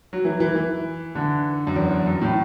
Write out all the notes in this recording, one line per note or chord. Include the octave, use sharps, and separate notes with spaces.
F#3
E3
E3
E3
D3
F#2
E2
F#2
A2